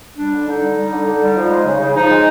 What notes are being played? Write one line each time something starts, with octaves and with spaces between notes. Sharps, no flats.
G3 D4
D3
D3 D#4
G3
G3
D3
D3
G3
F3
G#3
C#3
C#3
F3 D#4
G#3